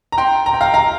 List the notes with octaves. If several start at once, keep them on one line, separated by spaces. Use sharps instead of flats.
A#5
G5 C6
A#5
G5
F5 A#5
F5 A#5